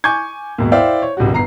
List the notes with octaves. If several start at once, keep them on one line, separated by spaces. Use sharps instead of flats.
G#5 C#6 D6 G6 G#6
D#2 G#2 B2
E4 C5 D5 E5 F5 G5
C#5
G#1 C#2 G3 F#4
G1 B3 A#5 C7